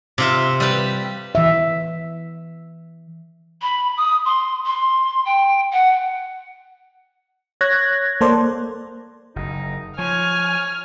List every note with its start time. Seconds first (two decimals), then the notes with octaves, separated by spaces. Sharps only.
0.18 C3 F4 E5
0.60 G3 B4
1.35 E3 E5
3.62 B5
3.97 D#6
4.25 C6
4.66 C6
5.25 G5
5.72 F#5
7.61 C#5 F#6 G#6 A#6
8.21 A#3 A4 C5 D5
9.36 F#1 D#4
9.99 F3 C#5 G#5 F6